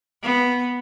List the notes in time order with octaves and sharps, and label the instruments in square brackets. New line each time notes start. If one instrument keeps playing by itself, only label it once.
[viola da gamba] B3